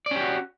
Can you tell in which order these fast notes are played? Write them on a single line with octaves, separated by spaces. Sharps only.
D5 C#4 G4 F#4